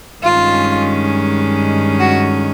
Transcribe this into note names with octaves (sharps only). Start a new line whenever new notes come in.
G2 D#3 G#3 C#4 F4
F#4